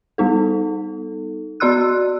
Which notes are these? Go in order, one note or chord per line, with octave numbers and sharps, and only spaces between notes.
G3 B3 D#4 A4
B3 F#4 D5 C6 E6 F#6